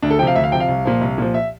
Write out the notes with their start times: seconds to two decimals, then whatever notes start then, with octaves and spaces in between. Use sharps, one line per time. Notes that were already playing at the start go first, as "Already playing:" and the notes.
0.03 D2 D4
0.10 A4
0.19 F3 G5
0.22 C3 F5
0.35 D2 E5
0.44 F5
0.52 C3 F3 G5
0.60 F5
0.68 C2
0.85 A#2 F3
1.01 C2
1.18 A#2 F3
1.34 E5